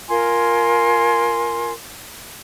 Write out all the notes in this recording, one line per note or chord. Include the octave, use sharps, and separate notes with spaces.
F4 A#4 G#5 C6